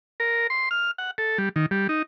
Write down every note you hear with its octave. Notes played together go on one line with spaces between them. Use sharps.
A#4
C6
F6
F#5
A4
G3
D#3
G3
D#4